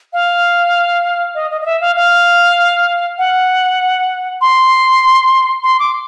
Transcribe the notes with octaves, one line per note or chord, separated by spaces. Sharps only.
F5
D#5
D#5
D#5
E5
F5
F5
F#5
C6
C6
D6